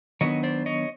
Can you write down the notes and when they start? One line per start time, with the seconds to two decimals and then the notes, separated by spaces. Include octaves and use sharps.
0.21 D#3 F#3 B3 D4 C#5 D#5
0.43 C5 D5
0.66 C#5 D#5